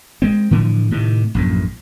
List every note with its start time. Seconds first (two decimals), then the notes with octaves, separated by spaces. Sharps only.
0.22 G#3 C4
0.51 A2 D3 E3 F3
0.91 A2 C3 D#3
1.35 A#1 F#2 A2